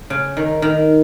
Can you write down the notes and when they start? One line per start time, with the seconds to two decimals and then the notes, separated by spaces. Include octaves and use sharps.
0.10 C#3
0.37 D#3
0.62 D#3